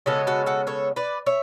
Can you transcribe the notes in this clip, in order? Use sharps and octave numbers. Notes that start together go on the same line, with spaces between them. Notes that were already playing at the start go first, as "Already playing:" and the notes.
C#3 G#3 B3 F#4 A4
F#4 A4
F#4 A4
A4 C#5
B4 D5
C#5 E5